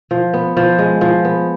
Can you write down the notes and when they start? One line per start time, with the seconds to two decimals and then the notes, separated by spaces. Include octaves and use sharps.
0.11 F3
0.34 B3
0.57 F3
0.79 G#3
1.01 F3
1.25 B3